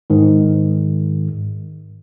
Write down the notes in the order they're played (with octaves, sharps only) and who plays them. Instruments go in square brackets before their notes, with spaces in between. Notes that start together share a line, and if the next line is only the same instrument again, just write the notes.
[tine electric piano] G#2 D#3